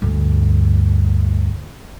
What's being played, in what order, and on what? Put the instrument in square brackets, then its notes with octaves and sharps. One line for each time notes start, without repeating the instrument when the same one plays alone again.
[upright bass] D2 G2